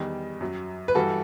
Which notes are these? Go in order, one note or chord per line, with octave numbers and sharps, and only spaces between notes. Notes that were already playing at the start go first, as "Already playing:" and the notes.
Already playing: E2 D#3 G3
F#2 F#3
B4
G2 E3 G3 F#4 A4